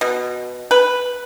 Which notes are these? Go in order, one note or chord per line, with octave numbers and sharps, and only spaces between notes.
B2
B4